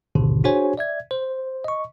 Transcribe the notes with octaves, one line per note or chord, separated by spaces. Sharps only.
A1 D2 G#2 B2 D3 D#3
D4 F#4 G#4 C5 C#5 G#5
D5 E5 G#6
C5
D#5 C#6